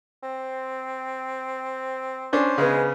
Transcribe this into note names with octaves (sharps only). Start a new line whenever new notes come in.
C4
C#4 D4 C5
C#3 G#3 B3